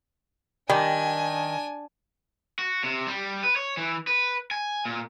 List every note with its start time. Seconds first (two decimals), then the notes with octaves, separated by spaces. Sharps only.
0.70 D#3 G3 D4 G#5
2.59 F#4
2.84 C3
3.07 G3
3.44 B4
3.56 C#5
3.77 E3
4.07 B4
4.51 G#5
4.85 A#2